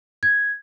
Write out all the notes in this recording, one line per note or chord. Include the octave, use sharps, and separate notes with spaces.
G#6